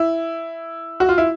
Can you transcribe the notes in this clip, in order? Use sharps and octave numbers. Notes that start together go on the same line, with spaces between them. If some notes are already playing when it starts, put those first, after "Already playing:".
Already playing: E4
F#4
F4
E4